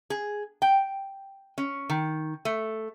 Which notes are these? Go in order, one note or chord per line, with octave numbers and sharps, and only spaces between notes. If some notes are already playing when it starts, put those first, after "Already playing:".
G#4
G5
C#4
D#3
A3